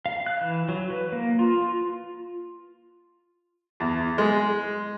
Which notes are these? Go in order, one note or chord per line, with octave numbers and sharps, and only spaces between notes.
F5
F#6
E3
F#3
B4
A#3
F4
E2
G#3